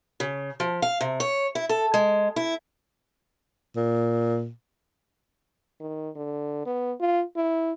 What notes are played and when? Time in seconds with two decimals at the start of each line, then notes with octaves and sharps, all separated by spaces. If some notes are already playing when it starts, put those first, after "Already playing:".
0.20 C#3
0.60 F3
0.82 F5
1.01 C3
1.20 C#5
1.55 E4
1.69 A4
1.94 G#3
2.36 E4
3.76 A#2
5.80 D#3
6.16 D3
6.66 B3
7.00 F4
7.36 E4